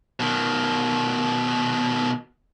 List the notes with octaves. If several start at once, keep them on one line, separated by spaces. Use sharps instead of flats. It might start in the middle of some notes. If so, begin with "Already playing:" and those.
B2 D#3